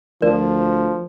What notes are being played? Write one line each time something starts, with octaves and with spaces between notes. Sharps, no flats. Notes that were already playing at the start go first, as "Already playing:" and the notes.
D2 F3 A#4 D5